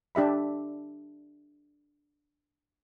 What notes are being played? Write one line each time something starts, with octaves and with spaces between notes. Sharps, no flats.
D4 G4 E5 B5